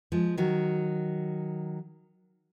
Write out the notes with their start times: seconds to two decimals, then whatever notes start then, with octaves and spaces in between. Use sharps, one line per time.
0.12 F3 G#3
0.38 D#3 F#3